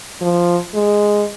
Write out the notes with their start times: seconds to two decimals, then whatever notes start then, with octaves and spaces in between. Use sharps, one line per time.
0.22 F3
0.75 G#3